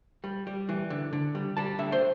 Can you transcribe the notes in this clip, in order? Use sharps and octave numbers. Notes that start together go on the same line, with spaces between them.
G3
G3
E3
D3
D3
G3
G3 A5
D3 E5
C5